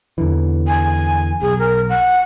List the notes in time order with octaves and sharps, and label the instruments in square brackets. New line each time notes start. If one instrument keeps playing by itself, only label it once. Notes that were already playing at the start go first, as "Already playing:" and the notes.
[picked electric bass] E2 D3 E3
[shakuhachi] G#5
[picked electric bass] B1 [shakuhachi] G#4
[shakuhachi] A#4
F#5